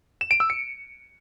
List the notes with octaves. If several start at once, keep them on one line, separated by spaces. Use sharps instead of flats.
E7
D7
E6
C#7